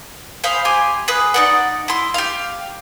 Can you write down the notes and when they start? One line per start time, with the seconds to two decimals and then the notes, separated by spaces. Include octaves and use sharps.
0.44 G#4 C5 F5 B5
0.65 G4 G#5 C6
1.08 G#4 B4
1.34 D#4 D5 F#5
1.88 E4 C6
2.14 G4 F5